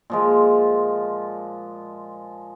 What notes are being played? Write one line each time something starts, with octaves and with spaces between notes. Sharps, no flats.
A#2 F3 G#3